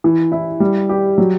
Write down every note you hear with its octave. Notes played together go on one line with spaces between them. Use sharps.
E3
E4
G3
G4
F#3